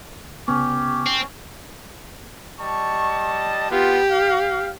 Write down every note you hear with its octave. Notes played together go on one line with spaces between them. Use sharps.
D2
C2 C#3 B3 C#4 G4
C4
G3 D#5 A5 C#6
B3 F4 G4
F5